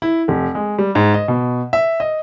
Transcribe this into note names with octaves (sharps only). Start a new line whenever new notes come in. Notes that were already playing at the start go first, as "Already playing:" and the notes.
E4
F1
G#3
G3
G#2
D#5
B2
E5
D#5